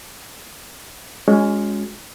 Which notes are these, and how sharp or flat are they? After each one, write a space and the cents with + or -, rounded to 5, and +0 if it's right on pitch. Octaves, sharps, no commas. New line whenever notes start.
G#3 +0 C#4 +20 F#4 -45